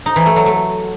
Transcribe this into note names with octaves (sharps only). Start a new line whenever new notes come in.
D#4
E3
A3
F#3
A3